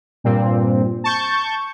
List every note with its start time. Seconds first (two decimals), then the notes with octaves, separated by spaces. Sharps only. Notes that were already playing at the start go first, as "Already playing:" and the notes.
0.24 G2 A#2 C4
1.04 A5 C#6 G6